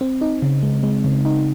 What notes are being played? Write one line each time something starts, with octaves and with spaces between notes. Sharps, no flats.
C4
D#4
C#3
G#3
G#3
C#3
D#4